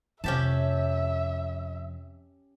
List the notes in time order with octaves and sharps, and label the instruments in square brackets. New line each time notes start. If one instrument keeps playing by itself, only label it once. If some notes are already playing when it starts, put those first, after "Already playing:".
[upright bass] F2 C3 [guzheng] C#4 G4 A5 [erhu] E5